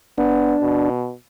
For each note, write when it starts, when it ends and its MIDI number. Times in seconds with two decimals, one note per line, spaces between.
0.18 0.55 59
0.18 0.90 62
0.62 1.13 47